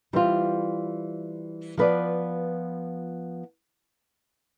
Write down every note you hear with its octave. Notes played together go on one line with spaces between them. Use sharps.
E3 G3 C4 F4
F3 B3 F4 B4 D5